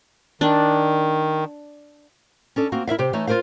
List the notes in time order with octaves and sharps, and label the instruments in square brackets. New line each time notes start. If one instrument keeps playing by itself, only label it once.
[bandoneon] D#3 [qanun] D4
[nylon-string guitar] C#4 D4 A4
A#3 C4 F#4
E4 A#4 E5 F5
C3 G4 C5
E3 A3 D#4 C#5
F4 G#4 A#4 C5 F5